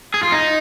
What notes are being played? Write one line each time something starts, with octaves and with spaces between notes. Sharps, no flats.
G#4
F4
D#4